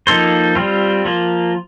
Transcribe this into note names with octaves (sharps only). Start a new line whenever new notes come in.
F3 A#3 D#4 A4 C5
G3 C4 F4
F3 A#3 F4